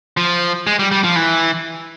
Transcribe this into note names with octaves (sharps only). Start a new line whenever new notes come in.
F3
G#3
G3
G3
F3
E3